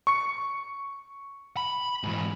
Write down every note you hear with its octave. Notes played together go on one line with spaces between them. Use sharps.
C#6 C#7
B5
G#2 E3